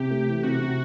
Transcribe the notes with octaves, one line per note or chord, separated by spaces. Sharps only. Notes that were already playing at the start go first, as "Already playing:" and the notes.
Already playing: C3 G4
A3
E3
C3 F#4
C3